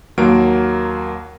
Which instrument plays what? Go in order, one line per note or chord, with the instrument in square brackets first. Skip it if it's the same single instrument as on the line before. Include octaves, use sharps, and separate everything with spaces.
[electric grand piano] D#2 F#3 A#3 A#4 D7